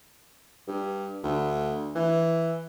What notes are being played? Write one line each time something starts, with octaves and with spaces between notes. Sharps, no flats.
G2
D2
E3